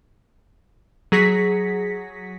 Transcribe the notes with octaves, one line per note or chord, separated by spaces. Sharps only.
F#3 G#4 A#6 B6 C#7